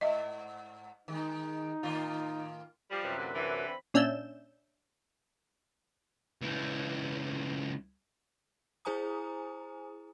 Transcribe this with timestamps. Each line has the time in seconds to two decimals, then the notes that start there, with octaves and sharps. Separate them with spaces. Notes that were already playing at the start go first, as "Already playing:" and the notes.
0.01 G#2 D#5 E5
1.08 D#3 G#3 D#4
1.83 A2 D#3 F4
2.90 F3 G3
3.04 F#2 C3 B4
3.17 A#2 D3
3.34 D3 E3
3.66 C4 B5
3.94 A#2 C#4 D4 E5 G6 E7
6.42 C#2 E3
8.85 E4 G#4 C5 G#5 A#5 D#6